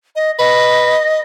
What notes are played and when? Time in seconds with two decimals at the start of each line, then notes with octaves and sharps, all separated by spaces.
0.16 D#5
0.39 B4 D#5